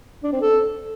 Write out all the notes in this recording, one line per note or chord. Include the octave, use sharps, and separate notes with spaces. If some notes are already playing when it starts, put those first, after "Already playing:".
D4
C4
A4